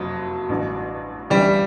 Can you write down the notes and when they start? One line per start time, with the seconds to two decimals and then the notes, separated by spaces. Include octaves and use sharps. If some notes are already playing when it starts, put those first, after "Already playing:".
Already playing: F#1 F2 C3 F#3
0.49 A1 G2 D3
1.30 D2 C#3 E3 G3 G4